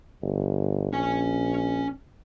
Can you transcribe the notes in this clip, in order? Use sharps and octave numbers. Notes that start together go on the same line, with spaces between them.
G1
A#1 C#4 G#5